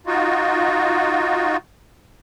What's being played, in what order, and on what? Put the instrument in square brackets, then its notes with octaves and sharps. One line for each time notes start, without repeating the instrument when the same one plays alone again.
[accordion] D#4 F4 F#4